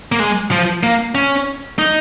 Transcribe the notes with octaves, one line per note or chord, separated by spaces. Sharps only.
A#3
G#3
F3
A#3
C#4
D#4